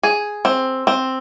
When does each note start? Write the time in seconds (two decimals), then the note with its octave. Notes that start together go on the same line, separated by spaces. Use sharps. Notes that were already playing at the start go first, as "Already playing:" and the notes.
0.03 G#4
0.45 C4
0.87 C4